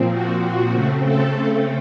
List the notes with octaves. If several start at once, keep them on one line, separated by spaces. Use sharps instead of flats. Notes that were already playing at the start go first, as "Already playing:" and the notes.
Already playing: A#2 F3 C4
F#4
F#4
C#3 A3 C4
A4